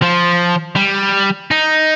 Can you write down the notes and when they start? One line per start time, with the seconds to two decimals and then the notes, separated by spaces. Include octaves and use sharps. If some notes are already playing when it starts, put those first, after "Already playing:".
0.02 F3
0.76 G3
1.51 D#4